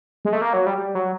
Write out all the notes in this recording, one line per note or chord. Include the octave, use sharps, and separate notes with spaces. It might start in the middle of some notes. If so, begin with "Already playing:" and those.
G#3
A3
A#3
F#3
G3
G3
F#3